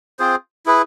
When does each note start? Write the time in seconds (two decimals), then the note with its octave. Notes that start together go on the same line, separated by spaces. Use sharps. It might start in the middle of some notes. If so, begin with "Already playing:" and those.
0.19 C4 F4 G#4 C5
0.66 E4 G#4 B4